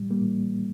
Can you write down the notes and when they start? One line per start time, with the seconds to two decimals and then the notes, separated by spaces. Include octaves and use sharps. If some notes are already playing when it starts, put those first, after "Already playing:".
Already playing: A2 E3 G3
0.10 G3 A#3
0.20 A2 E3